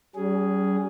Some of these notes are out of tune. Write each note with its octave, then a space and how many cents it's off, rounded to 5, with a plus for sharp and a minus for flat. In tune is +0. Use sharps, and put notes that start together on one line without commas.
G3 -35 C#4 +30 G#4 +0